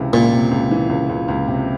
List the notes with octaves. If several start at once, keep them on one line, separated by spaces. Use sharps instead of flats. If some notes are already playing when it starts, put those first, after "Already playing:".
Already playing: C#2 C3 E3
C#2 A#2
C3
C#2
E3
C#2
C#2
C#2
C3